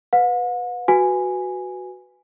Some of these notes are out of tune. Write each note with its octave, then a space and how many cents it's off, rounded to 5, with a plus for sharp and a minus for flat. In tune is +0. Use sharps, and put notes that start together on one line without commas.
B4 +0 F#5 -45
F#4 +0 B4 +0 G#5 +0